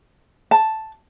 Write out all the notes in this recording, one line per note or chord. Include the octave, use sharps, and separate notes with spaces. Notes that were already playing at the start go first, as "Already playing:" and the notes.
A5